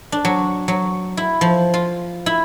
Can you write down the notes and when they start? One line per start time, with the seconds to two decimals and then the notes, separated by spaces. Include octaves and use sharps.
0.12 D4
0.25 F#3
0.68 F#3
1.17 E4
1.41 F3
1.74 F4
2.26 E4